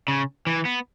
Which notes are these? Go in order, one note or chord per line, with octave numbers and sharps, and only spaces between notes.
C#3
E3
B3